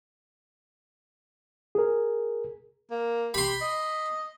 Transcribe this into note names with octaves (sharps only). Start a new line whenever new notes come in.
G#4 A#4
A#3
G4 B5 C6
D#5